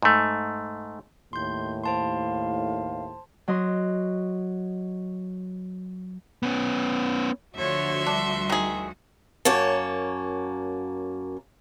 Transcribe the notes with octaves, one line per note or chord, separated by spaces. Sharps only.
G#2 A3
D#2 A2 C6 G6
C5 F5 A5 C6
F#3 D#5 C6
B3 C#4
D2 D3 F3 F#4 C#5 E5 C6
G3 D4
D#3 G#4
F#2 A#3 C#5 A5